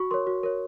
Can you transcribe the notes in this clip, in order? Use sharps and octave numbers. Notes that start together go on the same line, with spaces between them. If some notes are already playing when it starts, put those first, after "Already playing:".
Already playing: F#4 C#6
A#4 C#5 C6
F#4
A#4 C#5